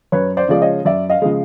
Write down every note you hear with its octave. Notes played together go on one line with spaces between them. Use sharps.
F#2 B4 C#5
C5 D5
C#3 F3 G#3 D5
C#5 D#5
F#2 D5 E5
D#5 F5
C#3 F3 G#3